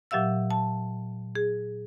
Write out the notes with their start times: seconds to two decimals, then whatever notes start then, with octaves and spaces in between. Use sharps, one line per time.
0.11 A#2 F#3 G4 E5 F5 E6
0.51 A5
1.35 G#4